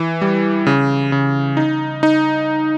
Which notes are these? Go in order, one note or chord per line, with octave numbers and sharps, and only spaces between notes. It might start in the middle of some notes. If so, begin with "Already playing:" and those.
Already playing: E3
G3
C#3
C#3
D#4
D#4